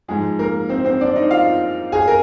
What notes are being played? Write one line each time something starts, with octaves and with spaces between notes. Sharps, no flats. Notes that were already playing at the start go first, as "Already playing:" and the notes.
G#2 F3 G#3 G#4
A#3 A#4
C4 C5
C4 C5
D4 D5
D#4 D#5
F4 F5
G#4 G#5
A#4